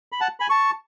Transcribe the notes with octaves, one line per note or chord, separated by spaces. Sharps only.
B5
F#5 A5
G#5 B5
A5 C#6